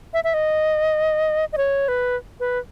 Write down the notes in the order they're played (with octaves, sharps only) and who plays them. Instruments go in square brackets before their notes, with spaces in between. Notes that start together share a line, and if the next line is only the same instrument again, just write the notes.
[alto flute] E5
E5
D#5
D#5
C#5
B4
B4